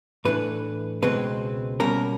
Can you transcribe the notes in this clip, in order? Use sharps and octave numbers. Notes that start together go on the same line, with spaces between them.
A2 E3 A3 D4 B4
C#2 B2 G#3 C4 B4
B2 G3 A#3 C#4 A#4